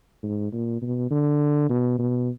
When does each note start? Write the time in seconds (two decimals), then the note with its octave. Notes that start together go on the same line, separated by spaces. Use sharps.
0.23 G#2
0.53 A#2
0.82 B2
1.11 D3
1.70 B2
1.99 B2